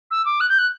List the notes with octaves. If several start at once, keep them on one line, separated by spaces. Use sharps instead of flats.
E6
D6
F#6
G6
F#6